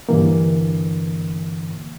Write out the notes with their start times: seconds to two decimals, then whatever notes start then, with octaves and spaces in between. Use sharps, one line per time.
0.09 G2 D3 E3 A#3